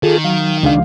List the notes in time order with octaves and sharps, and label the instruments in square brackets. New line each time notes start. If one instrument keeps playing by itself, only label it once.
[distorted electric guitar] D#3 [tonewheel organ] F4 G#4 A4
[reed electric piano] F#3 [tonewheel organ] F5
[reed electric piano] C#2 G#3 F5 [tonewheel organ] D4